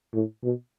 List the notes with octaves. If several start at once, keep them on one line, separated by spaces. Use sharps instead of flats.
A2
B2